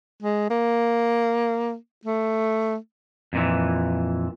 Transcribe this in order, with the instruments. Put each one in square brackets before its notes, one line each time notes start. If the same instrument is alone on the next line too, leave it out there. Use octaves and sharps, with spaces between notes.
[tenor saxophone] G#3
A#3
A3
[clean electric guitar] F2 A#2 E3